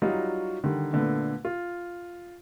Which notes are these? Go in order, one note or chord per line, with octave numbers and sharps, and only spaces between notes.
F#3 G3 D#4 F4 F#4
D3 D#3 G3
A#2 D3 A3 B3
F4